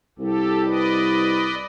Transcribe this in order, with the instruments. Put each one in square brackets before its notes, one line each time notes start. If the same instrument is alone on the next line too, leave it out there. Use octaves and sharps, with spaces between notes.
[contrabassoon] C2 [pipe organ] G4 A4
[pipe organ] B4 D5 D#5